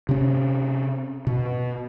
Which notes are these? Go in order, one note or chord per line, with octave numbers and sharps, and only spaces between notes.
C3 C#4
B2